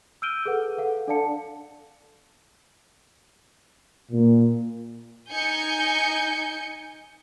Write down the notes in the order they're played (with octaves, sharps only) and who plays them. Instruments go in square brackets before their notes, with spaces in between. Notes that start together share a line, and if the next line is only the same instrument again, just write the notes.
[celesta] E6 F6 G6 D7 D#7 G7
G#4 A4 B4 F#5
A4 F5 F#5
D4 A4 D5 F5 A5 C#7
[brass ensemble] A#2
[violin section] D#4 G#5 G6 C#7